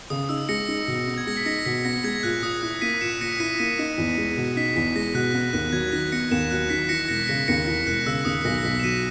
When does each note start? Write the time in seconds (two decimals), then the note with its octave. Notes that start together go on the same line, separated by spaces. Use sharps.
0.10 C#3 D#6
0.23 D#6
0.29 D#4 E6
0.49 G#3 A#6 C#7
0.68 D#4
0.88 B2
1.07 B3
1.18 G#6
1.27 G#3 A#6
1.37 B6
1.46 D#4 A#6 C#7
1.59 A#6
1.66 B2 B6
1.85 B3 A#6
2.04 G#3 G#6
2.23 A#2 F#6
2.43 A#2 D#6
2.62 E4 F#6
2.81 A#3 B6 D#7
3.01 A#2 C#7 E7
3.21 A#2 A#6 C#7
3.32 C#7
3.40 E4 B6 D#7
3.59 A#3 B6 D#7
3.79 D#4
3.98 E2
4.18 G#3
4.37 B2
4.57 D#4 B6
4.76 E2 B6
4.95 G#3 A#6
5.15 B2 F#6
5.34 B3 F#6
5.53 D#2 F#6
5.72 F#3 G#6
5.92 D#3 A#6
6.12 B3 A#6 C#7
6.31 D#2 C#7 E7
6.51 F#3 F#6
6.70 D#3 B6
6.89 E3 A#6 C#7
7.08 E1 A#6 C#7
7.24 B6
7.28 C#3 A#6 C#7
7.48 D#2 A#6 C#7
7.67 E3 A#6
7.86 E1 F#6
8.06 C#3 E6
8.16 E6
8.25 D#2 D#6
8.45 B1 A#6
8.58 A#6
8.64 B1 B6
8.80 E7
8.83 F#3 B6 D#7